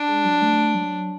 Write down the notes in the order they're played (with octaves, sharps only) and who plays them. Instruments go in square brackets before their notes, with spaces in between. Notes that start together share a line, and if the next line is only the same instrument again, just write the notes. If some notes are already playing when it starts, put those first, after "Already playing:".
Already playing: [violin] D4
[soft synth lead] G#3
F#3
A3
F#3